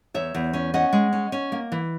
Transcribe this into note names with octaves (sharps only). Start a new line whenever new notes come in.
E2 C#5 E5
E2
C#4
C#4 D#5 F#5
G#3
C#4
C#4
A#3
E3